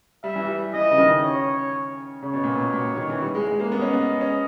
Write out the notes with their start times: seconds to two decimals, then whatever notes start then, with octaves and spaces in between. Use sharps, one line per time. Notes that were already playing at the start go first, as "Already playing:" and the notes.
0.24 G3 E5
0.36 E3
0.47 G3
0.74 E3 D#5
0.91 C#3
0.98 D#3
1.07 C#3
1.23 C#5
2.22 C#3 C#5
2.33 B2
2.44 A#2
2.54 B2
2.73 A#2
2.97 D#3
3.09 E3
3.21 G3
3.35 G#3
3.47 G#3
3.60 A#3
3.71 B3 D#5
3.82 C#4
3.93 B3
4.21 C#4